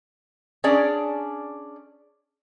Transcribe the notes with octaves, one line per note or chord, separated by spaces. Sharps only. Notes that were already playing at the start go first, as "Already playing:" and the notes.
C#4 D4 G#4 D5